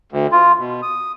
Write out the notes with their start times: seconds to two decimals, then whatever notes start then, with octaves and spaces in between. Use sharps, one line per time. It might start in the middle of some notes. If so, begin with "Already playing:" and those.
0.12 D2
0.32 F4
0.59 B2
0.82 D#6